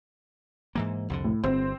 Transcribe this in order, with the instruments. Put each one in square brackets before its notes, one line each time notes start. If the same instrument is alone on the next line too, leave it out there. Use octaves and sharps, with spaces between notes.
[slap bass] G#2 E3 A#3
C2 F2 D3
[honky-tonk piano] A2
[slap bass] G1 [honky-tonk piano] C4